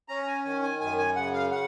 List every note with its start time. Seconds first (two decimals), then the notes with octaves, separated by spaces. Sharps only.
0.08 C#4 A#5
0.22 A#5
0.27 G#5
0.45 D#3 G#5
0.62 G#5
0.80 F#2 G#5
0.98 G#5
1.16 C#3 F#5
1.33 F5
1.51 F#5